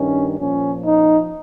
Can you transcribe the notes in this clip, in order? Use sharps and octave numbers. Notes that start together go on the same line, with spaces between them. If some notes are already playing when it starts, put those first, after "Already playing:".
Already playing: G2 D#3 C#4
A#2 F3 C#4
D#4